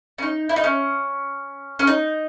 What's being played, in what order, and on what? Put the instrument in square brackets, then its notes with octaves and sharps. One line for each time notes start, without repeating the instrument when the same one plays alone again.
[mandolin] C#4
D#4
E4
D#4
C#4
C#4
D#4